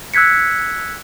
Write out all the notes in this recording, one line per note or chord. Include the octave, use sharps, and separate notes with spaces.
E6 F#6 G#6 B6 C#7